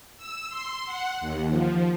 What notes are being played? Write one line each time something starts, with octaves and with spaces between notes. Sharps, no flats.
E6
C6
F#5
D#2
F3